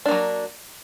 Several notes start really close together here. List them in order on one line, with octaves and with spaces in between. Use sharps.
D4 A#3 F#3